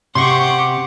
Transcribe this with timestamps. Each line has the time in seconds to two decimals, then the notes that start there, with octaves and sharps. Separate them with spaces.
0.15 C3 G4 F#5 C6 C#6